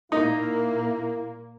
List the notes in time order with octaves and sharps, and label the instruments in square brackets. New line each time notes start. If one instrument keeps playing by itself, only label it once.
[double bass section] A#2 A#3 [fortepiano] D#4 [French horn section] E4